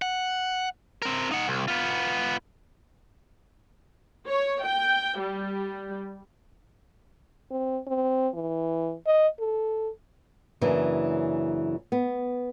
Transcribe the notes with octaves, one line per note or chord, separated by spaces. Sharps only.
F#5
C4 A#4
D#4 F#5
C2
B3 F4
C#5
G5
G3
C4
C4
E3
D#5
A4
F#2 C#3 E3 A#3 D4
B3